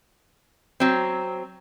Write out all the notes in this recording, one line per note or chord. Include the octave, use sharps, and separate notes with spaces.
F#3 C4